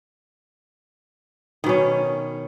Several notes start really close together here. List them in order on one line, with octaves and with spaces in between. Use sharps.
D#3 B2 C#4